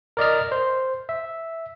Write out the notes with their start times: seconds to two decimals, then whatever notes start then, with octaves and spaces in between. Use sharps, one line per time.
0.17 A#4 D5 D#5 F6
0.52 C5
1.09 E5